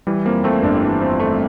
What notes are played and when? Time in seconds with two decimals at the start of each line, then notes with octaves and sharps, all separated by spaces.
0.07 E3 G3
0.25 F2 A#3
0.44 A3 C4
0.63 G1 D4
0.82 E3
1.01 F2
1.20 A3